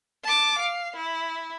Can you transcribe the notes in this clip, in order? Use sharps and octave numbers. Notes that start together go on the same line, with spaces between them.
A5 D6
F5
E4